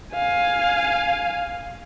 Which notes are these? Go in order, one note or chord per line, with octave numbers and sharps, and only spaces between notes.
F5 G#5